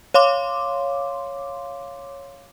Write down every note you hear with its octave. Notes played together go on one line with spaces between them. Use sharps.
C#5 F5 C6 D6